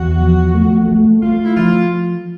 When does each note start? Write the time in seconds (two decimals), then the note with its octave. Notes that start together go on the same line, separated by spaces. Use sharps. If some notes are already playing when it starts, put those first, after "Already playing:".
Already playing: E2 F#4
0.21 F3
0.55 A3
0.89 A3
1.22 A3 F4
1.45 E4
1.57 F3 F4